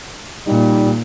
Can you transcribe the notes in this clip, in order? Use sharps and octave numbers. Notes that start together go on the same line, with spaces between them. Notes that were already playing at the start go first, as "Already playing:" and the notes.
A#2 G3 D#4